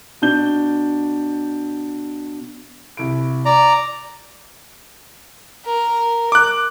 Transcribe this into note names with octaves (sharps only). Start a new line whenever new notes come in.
B2 D4 G6 G7
C2 E4 D7
D5 A#5
A#4
D6 F#6